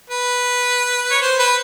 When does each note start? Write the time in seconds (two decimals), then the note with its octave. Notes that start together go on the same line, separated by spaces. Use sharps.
0.10 B4
1.11 C#5
1.22 C5
1.39 B4